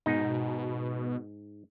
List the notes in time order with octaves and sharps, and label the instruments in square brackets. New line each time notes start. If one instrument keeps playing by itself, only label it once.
[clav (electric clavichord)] G#2 D#4 [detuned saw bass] B2